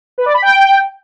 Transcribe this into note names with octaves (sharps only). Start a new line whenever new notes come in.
B4
D5
B5
G5